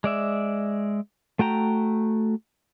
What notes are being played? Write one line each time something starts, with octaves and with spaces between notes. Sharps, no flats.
G#3 D5 E5
A3 F#4 G5 A#5